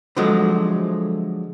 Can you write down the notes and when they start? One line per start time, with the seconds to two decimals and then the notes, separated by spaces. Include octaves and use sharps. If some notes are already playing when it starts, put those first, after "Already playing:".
0.16 D3 F3 F#3 G#3 A3